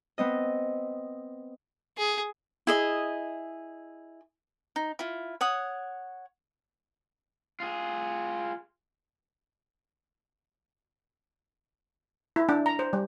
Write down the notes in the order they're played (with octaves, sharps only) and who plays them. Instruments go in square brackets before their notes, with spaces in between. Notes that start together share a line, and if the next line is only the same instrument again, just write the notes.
[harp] B3 C4 D#5
[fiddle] G#4
[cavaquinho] E4 G#4 D#5
D#4
E4 F4
C#5 F#5 D#6
[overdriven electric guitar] F4 G#4
[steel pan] E4
D4
A#5
C5
G3